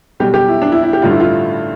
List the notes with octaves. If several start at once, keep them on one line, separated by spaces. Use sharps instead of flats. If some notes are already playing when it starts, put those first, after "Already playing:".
B1 B2 G3 G4
G4
E4
D4
E4
E4
G4
A1 G2 D3 G3 F4
E4
F4